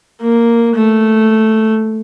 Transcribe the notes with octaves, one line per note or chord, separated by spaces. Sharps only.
A#3
A3